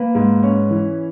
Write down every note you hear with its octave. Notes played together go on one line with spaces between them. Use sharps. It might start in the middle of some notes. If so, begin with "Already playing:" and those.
Already playing: A#3 B4
G#2
C#4
E3